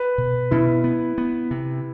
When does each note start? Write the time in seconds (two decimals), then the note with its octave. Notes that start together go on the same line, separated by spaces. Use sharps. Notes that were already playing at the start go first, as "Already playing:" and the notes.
Already playing: B4
0.18 B2
0.51 B2 E4
0.84 B3
1.18 B3
1.51 C3